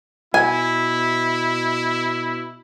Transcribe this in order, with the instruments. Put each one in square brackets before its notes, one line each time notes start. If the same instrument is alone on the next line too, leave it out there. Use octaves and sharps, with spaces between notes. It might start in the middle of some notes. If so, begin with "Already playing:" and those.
[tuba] B2 [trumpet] E4 [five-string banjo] G#5